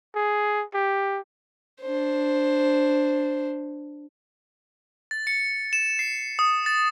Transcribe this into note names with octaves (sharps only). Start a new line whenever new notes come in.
G#4
G4
D4 C5
A6
C#7
E7
C7
D#6
A6